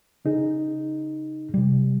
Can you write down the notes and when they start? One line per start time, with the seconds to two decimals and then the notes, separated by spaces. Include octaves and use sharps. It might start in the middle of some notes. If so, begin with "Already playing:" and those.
0.25 C#3 D#4 G#4
1.54 C3 G3